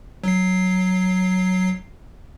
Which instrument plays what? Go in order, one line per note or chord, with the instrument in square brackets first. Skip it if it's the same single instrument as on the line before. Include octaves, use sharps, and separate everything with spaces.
[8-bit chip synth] F#3 C7